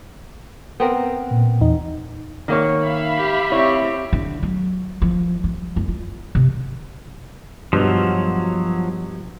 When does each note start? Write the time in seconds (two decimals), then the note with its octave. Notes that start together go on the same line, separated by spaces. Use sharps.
0.80 B3 C4 A#4
1.31 A#2
1.61 E2 D#4
2.48 D#3 A#3 C#5
2.83 E5 F5 B5
3.18 G4
3.52 C4 E4 G4 C#5
4.13 D3
4.43 F#3
5.02 F3
5.44 G3
5.76 F#1
5.88 F4
6.35 C3
7.73 G2 B2 F3 F#3